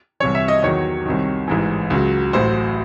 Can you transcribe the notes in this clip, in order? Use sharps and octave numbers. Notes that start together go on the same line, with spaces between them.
C2 C3 E3 C#5
E5
D#5
E2 D#3 F#3 C#5
C2 C3 D#3
A1 G#2 E3
C#2 C#3 F#3
A1 A2 F#3 C5